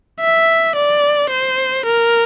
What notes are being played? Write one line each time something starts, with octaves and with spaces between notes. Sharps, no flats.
E5
D5
C5
A#4